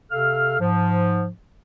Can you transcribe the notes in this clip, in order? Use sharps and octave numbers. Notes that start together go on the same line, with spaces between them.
C3 A4 F5 F6
G#2 F3